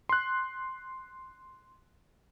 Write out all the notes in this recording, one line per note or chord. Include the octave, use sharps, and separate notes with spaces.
C6 F#6